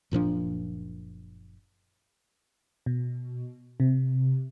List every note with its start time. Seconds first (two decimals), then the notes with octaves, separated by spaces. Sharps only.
0.11 F#1 A#2 F3 D4
2.86 B2
3.80 C3